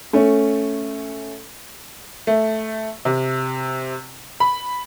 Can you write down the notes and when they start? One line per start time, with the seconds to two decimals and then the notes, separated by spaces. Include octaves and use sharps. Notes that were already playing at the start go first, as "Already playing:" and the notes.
0.13 A3 C#4
2.27 A3
3.05 C3
4.40 B5